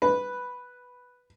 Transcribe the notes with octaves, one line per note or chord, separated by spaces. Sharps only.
B4